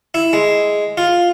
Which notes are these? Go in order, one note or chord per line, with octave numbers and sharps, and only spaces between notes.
E4
G#3
F4